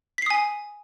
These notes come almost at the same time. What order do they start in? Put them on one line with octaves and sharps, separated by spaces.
B6 C7 D#6 G#5